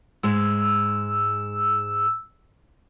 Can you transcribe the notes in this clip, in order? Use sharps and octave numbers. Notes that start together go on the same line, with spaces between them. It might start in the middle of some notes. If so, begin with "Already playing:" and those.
G#2 G#3 E6